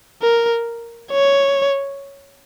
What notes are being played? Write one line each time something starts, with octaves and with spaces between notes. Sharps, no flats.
A#4
C#5